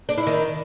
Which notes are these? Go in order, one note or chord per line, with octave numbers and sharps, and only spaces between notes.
D4
E4
D#3